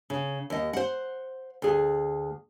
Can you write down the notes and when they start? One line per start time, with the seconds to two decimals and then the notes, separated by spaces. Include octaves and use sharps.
0.10 C#3
0.50 D#2 D#5
0.73 C5 F#5
1.62 D2 G#4